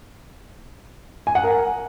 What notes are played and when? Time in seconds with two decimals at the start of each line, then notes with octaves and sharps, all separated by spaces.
1.27 G#5
1.35 F#5
1.44 A#4